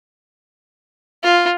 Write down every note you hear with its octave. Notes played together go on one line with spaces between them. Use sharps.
F4